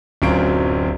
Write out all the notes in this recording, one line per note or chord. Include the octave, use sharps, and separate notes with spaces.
D1 F#2 F#3 C4 F4 D7